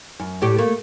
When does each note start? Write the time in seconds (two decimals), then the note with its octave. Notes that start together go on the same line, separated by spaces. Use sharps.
0.20 F#2
0.42 A2 G4
0.58 A3 A#3